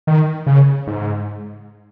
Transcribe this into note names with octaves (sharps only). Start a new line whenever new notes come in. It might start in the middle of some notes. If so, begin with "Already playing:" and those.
D#3
C#3
G#2